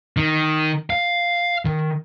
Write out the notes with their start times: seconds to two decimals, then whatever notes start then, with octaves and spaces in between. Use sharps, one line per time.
0.17 D#3
0.90 F5
1.65 D#3